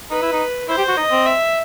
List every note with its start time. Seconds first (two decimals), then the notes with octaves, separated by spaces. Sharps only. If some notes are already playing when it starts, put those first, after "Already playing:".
0.10 D#4 B4
0.22 E4
0.33 D#4
0.68 E4 C5
0.78 G4
0.88 F#4
0.97 D#4 D#5
1.12 C4
1.26 E5